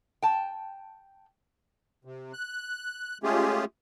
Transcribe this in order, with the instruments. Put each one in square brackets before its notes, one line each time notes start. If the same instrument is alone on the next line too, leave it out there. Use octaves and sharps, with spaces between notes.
[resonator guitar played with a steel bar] G5 A5
[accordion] C3
F#6
G#3 A3 C#4 F4 G4 G#4